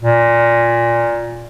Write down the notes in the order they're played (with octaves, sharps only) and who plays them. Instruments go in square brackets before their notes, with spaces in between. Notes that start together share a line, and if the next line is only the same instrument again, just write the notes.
[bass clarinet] A#2